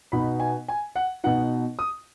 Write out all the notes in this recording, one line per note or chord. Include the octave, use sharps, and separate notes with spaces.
B2 B3 D#4 B5
G#5
G#5
F#5
B2 B3 D#4 F#5
D#6